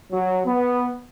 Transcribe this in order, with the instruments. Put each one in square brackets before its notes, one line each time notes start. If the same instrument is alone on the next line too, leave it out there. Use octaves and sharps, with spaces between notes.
[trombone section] F#3
B3